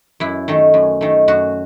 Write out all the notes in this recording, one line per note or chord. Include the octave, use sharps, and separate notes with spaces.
F#2 E4
D#3 A3
F#2
D#3 A3
F#2 F#4